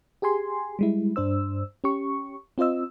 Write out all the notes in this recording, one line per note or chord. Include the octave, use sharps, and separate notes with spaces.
G4 G#4 G#5 C6
G3 G#3 E4
G2 D4 C5 E6
C#4 G4 C#6
C4 F4 C5 D#5 E6